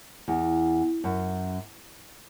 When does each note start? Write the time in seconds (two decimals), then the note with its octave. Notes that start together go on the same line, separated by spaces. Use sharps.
0.28 E2
1.04 F#2